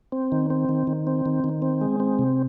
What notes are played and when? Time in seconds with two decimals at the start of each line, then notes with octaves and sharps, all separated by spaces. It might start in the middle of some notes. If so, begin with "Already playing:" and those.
0.12 C4
0.32 D#3
0.50 C4
0.69 D#3
0.87 D#3
1.07 C4
1.26 D#3
1.44 D#3
1.62 C4
1.81 G#3
2.00 C4
2.19 C3